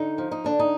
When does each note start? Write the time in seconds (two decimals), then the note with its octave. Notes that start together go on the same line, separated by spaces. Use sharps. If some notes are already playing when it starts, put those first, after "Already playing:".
Already playing: D3 D#4
0.18 F3
0.31 D#4
0.44 D3 D4
0.59 D#4